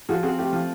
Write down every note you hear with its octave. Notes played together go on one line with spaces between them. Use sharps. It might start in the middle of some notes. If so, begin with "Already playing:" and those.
F3 F#4 G#4
C4 F#4 G#4
A3 F4 G4
F3